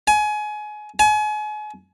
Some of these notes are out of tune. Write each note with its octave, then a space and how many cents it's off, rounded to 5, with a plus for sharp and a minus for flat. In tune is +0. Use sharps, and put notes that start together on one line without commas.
G#5 +25
G#5 +35